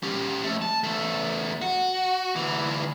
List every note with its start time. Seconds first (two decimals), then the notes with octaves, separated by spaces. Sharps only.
0.03 C#4 G4
0.44 F3 A3
0.62 A5
0.84 E2 A3
1.62 F#4
2.36 D2 E3